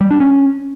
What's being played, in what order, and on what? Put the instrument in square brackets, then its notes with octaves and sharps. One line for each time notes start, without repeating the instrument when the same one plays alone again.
[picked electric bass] G3
D4
C#4